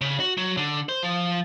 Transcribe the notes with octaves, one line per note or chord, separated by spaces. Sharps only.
C#3
F#4
F#3
D3
C5
F3